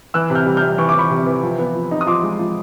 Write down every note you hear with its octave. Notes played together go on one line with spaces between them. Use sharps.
E3 E6 F#6
C3
F6 G6
G3
F6 G6
G3
E3 C#6
D6
E3 B5 C#6
C3
E3
F3
B3
F3
D#4
D#6
F3 C6 D6
G#3
F3